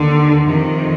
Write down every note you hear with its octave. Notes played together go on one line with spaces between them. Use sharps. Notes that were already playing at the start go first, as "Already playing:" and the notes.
Already playing: D#2 D3
F2 C3 D#3